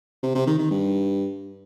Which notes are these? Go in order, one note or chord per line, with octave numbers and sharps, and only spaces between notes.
C3
C3
D#3
D#3
G2